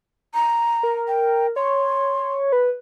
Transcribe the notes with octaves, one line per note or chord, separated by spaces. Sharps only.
A#5
A#4
G5
C#5 C6
B4